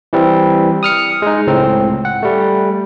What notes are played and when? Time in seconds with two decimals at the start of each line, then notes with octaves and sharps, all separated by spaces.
0.13 E3 G3 C4
0.83 D#6 F6 C#7
1.22 G#3 D#4
1.47 C#2 A2 C4
2.05 F#5
2.23 G3 A3